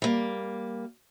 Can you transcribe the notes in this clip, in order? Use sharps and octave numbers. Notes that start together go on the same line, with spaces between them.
G3 A#3